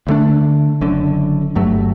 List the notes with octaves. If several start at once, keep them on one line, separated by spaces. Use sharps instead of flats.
D2 D3 A3 D4
F#1 F#2 D3
G1 G2 F#3 A3